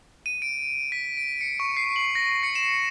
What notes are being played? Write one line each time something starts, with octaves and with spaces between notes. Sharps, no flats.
D#7
D7
B6
D7
C#7
C#6
C7
F#7
A#6
C#7
E7